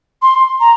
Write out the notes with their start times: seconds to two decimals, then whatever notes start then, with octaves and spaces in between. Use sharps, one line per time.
0.22 C6
0.60 A#5